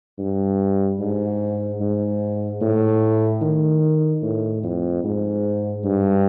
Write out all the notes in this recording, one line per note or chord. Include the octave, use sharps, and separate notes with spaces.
G2
G#2
G#2
A2
D#3
A2
F2
G#2
G2